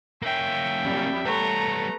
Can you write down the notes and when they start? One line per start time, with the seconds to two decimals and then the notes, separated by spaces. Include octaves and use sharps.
0.22 A#3 C#4 E5 G5
0.85 F2 G3
1.25 G3 A3 B3 C#5 A#5